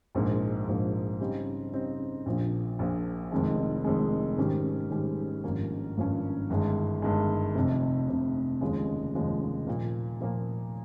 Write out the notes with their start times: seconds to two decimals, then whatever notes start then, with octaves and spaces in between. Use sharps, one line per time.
0.15 A#1 G#2 F3 A#3
0.67 A#1 G#2 F3 A#3
1.20 C#3 G3 C4 D#4
1.72 C#3 G3 C4 D#4
2.26 A#1 A#2 F3
2.79 A#1 A#2 F3
3.32 F1 F2 D#3 G#3
3.84 F1 F2 D#3 G#3
4.38 G#2 D#3 G3 C#4 G4
4.90 G#2 D#3 G3 C#4 G4
5.44 G#1 G2 F3 A#3 C#4
5.97 G#1 G2 F3 A#3 C#4
6.50 G1 G2 D#3 G#3
7.02 G1 G2 D#3 G#3
7.55 F1 F2 C3
8.09 F1 F2 C3
8.61 F1 D#2 C#3 F3 G#3
9.15 F1 D#2 C#3 F3 G#3
9.67 A#2 F3 A#3
10.20 A#2 F3 A#3